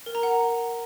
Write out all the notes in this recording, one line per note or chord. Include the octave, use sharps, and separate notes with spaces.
A#4
A#5
F#5